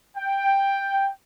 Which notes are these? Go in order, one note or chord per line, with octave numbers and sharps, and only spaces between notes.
G5